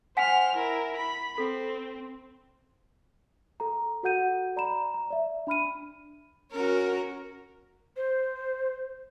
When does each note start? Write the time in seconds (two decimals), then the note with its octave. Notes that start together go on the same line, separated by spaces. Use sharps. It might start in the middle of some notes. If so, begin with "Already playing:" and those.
0.17 C5 F#5 G#5 F6 B6
0.56 E4 A#4
0.97 B5
1.38 C4 A4
3.60 A4 A#5
4.03 F#4 A4 F#5 G6 D#7
4.56 D5 A#5 B5 E7
4.94 A#5
5.11 D5 E5
5.47 D4 B5 F6 D#7
6.52 C#4 F#4 A#4
7.96 C5